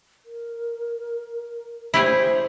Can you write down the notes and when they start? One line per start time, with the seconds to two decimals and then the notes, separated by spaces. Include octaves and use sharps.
0.26 A#4
1.94 E4 G4 G#4 C5